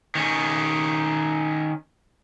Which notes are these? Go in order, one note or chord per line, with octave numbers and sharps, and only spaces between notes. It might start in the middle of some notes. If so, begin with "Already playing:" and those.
D#3 C#4